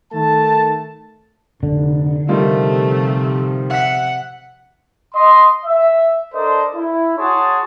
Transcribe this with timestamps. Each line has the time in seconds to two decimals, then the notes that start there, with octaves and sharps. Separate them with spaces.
0.12 D#3 A3 A5
1.63 F1 D3
2.29 C3 D#3 F3 G3 A3 F4
3.71 E5 F#5 B6
5.14 D#5 C6
5.66 E5
6.34 D4 A4 A#4 C5 D5 D#5
6.75 E4
7.18 F#4 G#4 C#5 F#5 A5 C6